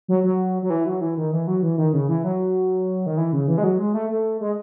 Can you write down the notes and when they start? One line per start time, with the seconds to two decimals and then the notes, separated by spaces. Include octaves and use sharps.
0.08 F#3
0.24 F#3
0.62 F#3
0.70 E3
0.86 F#3
1.01 E3
1.17 D#3
1.33 E3
1.47 F#3
1.62 E3
1.78 D#3
1.93 C#3
2.09 E3
2.24 F#3
3.06 D#3
3.17 E3
3.33 C#3
3.48 E3
3.58 G#3
3.64 F#3
3.79 G#3
3.94 A3
4.09 A3
4.41 G#3